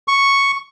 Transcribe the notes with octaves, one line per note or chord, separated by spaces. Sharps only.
C#6